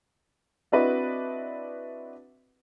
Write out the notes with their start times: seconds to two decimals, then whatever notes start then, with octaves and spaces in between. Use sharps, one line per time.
0.72 C4 D4 E4 F#4 B4 D#5